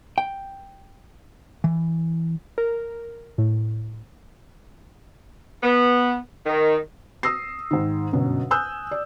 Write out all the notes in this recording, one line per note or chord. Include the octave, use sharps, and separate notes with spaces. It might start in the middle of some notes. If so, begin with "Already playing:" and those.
G5
E3
A#4
A2
B3
D#3
D#6 E6 A#6 C7
G#2 D#3
G1 F#2 B2
G#5 D#6 E6 F#6 G6
D5